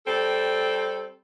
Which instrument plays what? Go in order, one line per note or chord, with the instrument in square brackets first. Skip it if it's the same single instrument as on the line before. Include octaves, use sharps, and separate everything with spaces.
[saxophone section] G3 C4 A4